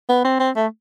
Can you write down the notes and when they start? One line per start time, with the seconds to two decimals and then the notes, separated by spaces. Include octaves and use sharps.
0.09 B3
0.25 C4
0.39 C4
0.56 A3